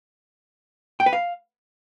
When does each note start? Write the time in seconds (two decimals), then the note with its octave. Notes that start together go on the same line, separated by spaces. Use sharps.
1.00 G5
1.06 B4
1.13 F5